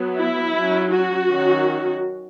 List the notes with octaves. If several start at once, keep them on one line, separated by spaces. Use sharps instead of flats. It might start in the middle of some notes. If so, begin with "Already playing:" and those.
Already playing: F#3 B3
E4
F#3 C#4
F#4
D#3 F#3 C#4